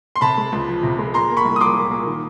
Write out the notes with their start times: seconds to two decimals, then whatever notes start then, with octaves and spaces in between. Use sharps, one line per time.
0.16 C6
0.21 C3 A5 B5
0.37 G#3
0.52 C#2
0.68 F3
0.83 C3
0.99 G#3
1.14 A#2 A#5 C6
1.30 A#3
1.37 B5 C#6
1.45 C2
1.56 D#6
1.60 F3 C6 D6
1.77 A#2
1.91 A#3
2.07 D#3